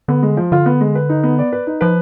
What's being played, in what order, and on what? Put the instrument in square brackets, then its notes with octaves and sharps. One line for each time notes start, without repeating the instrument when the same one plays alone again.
[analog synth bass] D3 [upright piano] B3
[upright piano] G#3
F3
[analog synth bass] D3 [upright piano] F4
[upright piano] B3
G#3
B4
D#4
B3
D5
B4
D#4
[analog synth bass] F3 [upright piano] B4